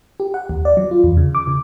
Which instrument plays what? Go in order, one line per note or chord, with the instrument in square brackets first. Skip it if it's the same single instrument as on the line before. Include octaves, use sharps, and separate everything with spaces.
[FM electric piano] G4
F#5
D#2
D5
F#3
F4
E2
C#3
D6
C#3